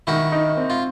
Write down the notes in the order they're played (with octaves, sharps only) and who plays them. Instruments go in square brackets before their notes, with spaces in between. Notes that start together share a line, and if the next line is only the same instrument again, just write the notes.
[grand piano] D#3 [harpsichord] E4 F#4
[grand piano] D#4
C4
[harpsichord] F4